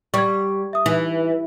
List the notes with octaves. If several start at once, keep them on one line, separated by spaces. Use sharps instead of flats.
G3 C#6 G#6
E5 D#6
E3 D#4